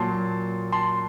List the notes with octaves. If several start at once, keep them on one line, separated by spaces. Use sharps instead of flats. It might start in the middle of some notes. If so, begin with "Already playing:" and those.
Already playing: A#2 F#3 A5 C6
A5 C6